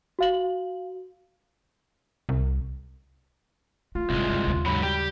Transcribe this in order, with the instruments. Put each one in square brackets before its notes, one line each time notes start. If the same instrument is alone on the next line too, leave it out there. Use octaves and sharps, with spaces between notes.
[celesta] F#4 F5 F#7
[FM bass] C2
[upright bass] A3 [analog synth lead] F4
[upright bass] G1 A2 [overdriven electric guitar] C2 G#3
[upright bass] F#2 B2
D#2 C#3
[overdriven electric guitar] G#2 F#3 [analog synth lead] B5
[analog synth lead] G3 [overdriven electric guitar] G4